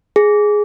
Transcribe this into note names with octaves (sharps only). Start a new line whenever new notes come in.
G#4